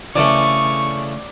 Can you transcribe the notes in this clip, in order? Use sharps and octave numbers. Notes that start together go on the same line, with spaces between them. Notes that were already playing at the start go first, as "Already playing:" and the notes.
C#3 E3 A3 D5 C#6